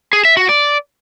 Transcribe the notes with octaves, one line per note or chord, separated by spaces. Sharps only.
G#4
E5
F#4
D5